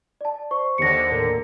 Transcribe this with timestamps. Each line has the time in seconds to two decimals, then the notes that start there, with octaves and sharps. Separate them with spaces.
0.21 D5 A5
0.51 C5 C#6
0.78 D#2 D3 A#6 C#7
1.12 A2 A#4